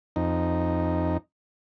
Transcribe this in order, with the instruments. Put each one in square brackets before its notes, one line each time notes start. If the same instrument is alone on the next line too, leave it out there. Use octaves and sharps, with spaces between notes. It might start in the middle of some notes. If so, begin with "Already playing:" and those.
[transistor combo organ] F2 D#4